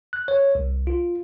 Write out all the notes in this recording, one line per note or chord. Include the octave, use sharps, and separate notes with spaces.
F#6
C#5
C2
F4